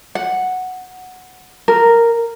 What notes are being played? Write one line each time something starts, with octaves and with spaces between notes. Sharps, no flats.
F#5
A#4